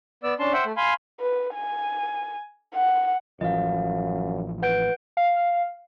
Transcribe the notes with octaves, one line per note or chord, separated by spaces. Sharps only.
B3 D5 E6
C#4 D4 A5 C6
C5 E5 F#5 G5
A3
F5 G#5 B5 C6
B4
G#5
F#5
A1 F#2 E3 F3 D#5 F5
B4 F#5 G6 D7
F5